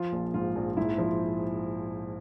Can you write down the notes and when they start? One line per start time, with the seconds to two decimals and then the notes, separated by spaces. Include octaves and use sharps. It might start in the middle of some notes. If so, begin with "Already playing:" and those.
Already playing: F3 F4
0.12 A#1
0.34 G#2 F4
0.56 A#1
0.77 G#2 E4
0.98 F3